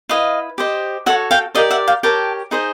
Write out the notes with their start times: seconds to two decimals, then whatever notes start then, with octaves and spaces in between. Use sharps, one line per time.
0.09 E4 G4 B4 D#5 F5
0.58 G4 C5 D#5
1.06 F#4 A4 C#5 E5 F#5
1.31 F5 G5
1.55 G4 A#4 D5 D#5 F5
1.71 E5 F#5
1.88 F5 G5
2.03 G4 A#4 C#5 G5 A5
2.51 D#4 G#4 C5 D#5